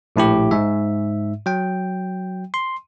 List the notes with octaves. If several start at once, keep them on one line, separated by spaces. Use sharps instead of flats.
A#1 A2 E4 G4
G#2 E5
F#3 G5
C6